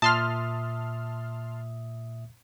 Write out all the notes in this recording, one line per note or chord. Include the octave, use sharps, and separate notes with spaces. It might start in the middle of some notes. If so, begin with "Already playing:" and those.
A#2 E5 A5 C6 D#6 F6